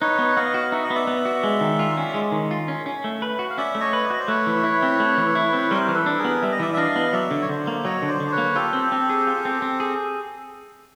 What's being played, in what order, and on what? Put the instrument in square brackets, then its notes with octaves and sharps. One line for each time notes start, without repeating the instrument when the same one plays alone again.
[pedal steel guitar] D#4 [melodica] B4 C#5
[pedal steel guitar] B3
[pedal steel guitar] B3 [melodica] D#5 F5
[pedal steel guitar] F#4
[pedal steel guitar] D#4 [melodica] E5
[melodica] D#5
[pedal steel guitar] B3 [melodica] D5 E5
[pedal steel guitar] B3
F#4
G#3
D#3
F4
C#4
G#3
D#3
F4
C#4
C#4
A3
B4
F#4
[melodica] F5
[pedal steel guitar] C#4 [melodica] D5 E5
[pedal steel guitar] A3
[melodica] C#5 D#5
[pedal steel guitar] B4
[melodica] D5
[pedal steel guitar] F#4 [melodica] D#5
[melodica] C5 D5
[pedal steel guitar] A3 [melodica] B4 C#5
[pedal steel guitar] E3
E4
C4
A3
E3
E4
C4
[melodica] B4
[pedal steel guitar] G3 [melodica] A#4 C5
[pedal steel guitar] E3
[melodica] A4 B4
[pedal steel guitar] D4
[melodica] G#4 A#4
[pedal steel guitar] B3
[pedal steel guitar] G3 [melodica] E5
[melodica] D#5
[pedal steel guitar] E3 [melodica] D5 E5
[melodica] E5
[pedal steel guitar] D4 [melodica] D#5 F5
[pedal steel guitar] B3
[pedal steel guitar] F#3 [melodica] D5 E5
[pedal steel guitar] D3
[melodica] C#5
[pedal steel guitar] D3 [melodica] C5 D5
[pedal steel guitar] A#3
[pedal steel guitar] F#3 [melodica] C#5 D#5
[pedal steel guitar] D3
[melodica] C5 D5
[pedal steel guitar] D3
[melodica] D5
B4 C#5
[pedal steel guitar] A#3
[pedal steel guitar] F4 [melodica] G4 A4
[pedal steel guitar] C4
C4
G#4
F4
C4
C4
G#4